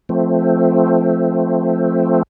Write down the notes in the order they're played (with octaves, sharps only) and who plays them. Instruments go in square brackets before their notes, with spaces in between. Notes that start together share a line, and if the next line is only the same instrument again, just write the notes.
[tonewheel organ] F3 A3 C4